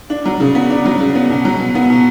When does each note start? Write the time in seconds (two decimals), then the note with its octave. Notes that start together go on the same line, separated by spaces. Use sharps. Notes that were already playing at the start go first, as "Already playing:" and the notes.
0.10 D4
0.25 F#3
0.40 C#3
0.55 B3
0.70 D4
0.86 F#3
1.00 C#3
1.15 B3
1.30 B2
1.45 F#3
1.60 B2
1.75 B3
1.90 B2